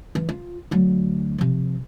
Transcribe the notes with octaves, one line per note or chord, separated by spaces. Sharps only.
E3
F4
D2 F#3
C3 F3